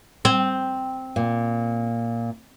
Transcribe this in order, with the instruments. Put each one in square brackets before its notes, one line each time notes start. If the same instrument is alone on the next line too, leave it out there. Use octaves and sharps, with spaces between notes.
[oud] C4
[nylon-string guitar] A#2